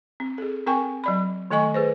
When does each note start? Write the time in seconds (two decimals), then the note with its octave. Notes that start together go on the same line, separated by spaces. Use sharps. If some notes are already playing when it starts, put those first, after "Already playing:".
0.20 C4
0.38 G#4 A4
0.67 C4 A#4 G5 G#5 C#6
1.04 F#3 D5 B5
1.51 D#3 A3 A4 D#5 G#5 C#6
1.74 G#4 B4 C5